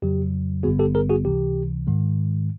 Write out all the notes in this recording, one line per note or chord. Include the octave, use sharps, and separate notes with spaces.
F2 C#3 F#3 G4
G#1 G2 D3 G3 B3 F#4 G#4
G4 A4
G#4 A#4
F#4 G#4
C#2 C3 E3 G4
G#2 D#3 G#3